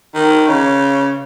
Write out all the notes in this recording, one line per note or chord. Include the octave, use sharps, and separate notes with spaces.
D#3
C#3